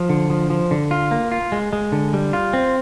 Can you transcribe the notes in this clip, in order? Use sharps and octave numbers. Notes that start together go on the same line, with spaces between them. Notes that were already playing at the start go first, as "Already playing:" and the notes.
Already playing: F3
D3
F3
F3
D3
F4
A#3
F4
G#3
G#3
D3
G3
F4
C4